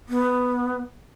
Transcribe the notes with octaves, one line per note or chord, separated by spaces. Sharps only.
B3